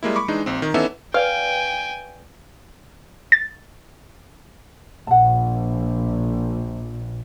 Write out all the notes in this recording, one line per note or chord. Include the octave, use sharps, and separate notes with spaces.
G3 G#3 A#3 E4
B5 C#6 D6
E3 G#3 D4 D#4
A#1 C4
D#3
E3 B3 C#4 D#4 A4 E5
B4 D5 F5 G5 G#5
A6
A#1 F#5 A5